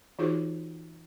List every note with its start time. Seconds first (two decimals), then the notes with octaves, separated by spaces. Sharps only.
0.19 E3 D#4 F4 F#4 G#4 C5